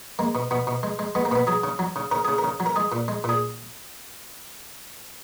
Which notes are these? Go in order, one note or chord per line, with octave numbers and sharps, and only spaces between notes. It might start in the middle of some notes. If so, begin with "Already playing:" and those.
G#3 A#3
B2
B2 B3
B2
G#3
G#3
G#3 B3
A#3
B2 B3
F#3 G#4
C#3
F#3
C#3
C#3 A#4
C#3 G#4
A#4
C#3
F#3
A#4
G#3 G#4
A#2
G#3
A#2 G#4